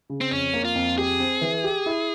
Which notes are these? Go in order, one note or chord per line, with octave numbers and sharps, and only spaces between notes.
C#3
C4
F2 C#4
A#3
F4
F2
G4 G#4
C4
E3
G4
E4